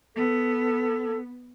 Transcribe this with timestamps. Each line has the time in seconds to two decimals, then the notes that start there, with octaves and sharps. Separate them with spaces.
0.16 B3 A4